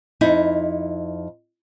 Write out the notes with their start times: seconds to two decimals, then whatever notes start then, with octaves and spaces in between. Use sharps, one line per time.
0.21 F2 D#4 E4